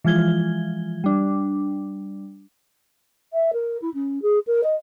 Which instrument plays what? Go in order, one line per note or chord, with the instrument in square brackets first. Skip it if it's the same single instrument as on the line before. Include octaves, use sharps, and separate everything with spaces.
[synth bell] E3 F3 G#3 F4 G#6 G7
G3 D4
[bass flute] E5
A#4
E4
C#4
G#4
A#4
D#5